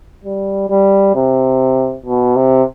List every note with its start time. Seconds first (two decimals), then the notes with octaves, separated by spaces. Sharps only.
0.24 G3
0.70 G3
1.15 C3
2.06 B2
2.36 C3